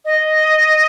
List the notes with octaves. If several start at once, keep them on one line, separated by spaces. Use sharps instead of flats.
D#5